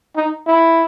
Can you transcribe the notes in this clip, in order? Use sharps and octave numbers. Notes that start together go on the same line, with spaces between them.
D#4
E4